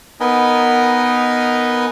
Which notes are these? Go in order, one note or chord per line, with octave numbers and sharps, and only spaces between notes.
B3 D#4 A#4 B4 D#5 G#5